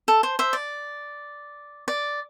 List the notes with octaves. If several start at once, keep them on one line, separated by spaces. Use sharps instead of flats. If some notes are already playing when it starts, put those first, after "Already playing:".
A4
C5
C5 E5
D5
D5